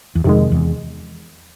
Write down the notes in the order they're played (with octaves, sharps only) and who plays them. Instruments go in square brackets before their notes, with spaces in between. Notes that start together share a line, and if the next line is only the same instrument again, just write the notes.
[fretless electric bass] E2
[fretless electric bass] F2 [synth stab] C3 D#3 G#3
[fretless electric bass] E2